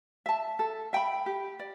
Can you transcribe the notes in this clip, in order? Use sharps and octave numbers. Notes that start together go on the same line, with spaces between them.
E5 A5
A4
E5 G5 B5
G4
D5